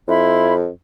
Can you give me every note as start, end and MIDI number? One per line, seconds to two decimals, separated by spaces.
0.08 0.69 41
0.08 0.53 64
0.08 0.53 83
0.08 0.53 84